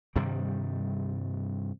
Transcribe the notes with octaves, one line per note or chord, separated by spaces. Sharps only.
G2 C3 D#3 G3